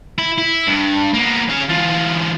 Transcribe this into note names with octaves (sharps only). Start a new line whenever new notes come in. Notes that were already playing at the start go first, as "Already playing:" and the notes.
E4
E4
G2
A#3 B3
C#4 F5
E3 F4